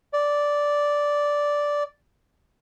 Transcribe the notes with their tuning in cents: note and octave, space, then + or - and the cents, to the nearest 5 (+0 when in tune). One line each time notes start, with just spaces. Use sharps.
D5 -5